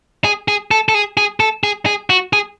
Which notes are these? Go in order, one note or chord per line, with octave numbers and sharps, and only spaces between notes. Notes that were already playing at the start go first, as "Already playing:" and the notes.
G#4
G#4
A4
A4
G#4
G#4
A4
G#4
G#4
F#4
G#4